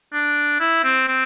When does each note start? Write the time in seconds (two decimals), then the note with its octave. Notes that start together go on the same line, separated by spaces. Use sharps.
0.13 D4
0.60 E4
0.84 C4
1.08 C4